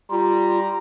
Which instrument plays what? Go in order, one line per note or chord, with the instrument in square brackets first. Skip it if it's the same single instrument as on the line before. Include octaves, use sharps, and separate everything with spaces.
[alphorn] G3 [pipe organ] F4 [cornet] A#5